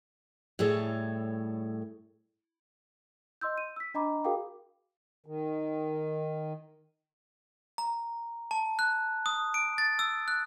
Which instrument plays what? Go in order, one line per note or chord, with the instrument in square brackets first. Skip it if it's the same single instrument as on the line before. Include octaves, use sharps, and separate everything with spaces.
[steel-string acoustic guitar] A2 G3 G#4 A4 C#5
[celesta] D#5 C6 E6 G6
D#7
E6 B6
D4 D#5 A#5 B5 D6
F#4 G#4 A#4 F5 G5 D6
[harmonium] D#3
[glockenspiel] A#5
A5
F#6
D#6
D7
A6
E6
F#6